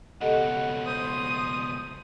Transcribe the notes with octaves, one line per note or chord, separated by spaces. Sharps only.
C#2 B2 G4 A4 D#5 F#5
C5 D#6